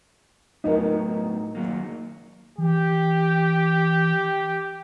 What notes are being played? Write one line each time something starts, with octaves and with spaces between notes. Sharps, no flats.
A2 F#3 B3 D#4 A#4
D#3 F#3 A#3
E3 G4